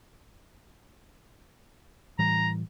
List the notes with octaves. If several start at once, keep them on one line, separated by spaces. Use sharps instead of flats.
A2 E3 G3 A#5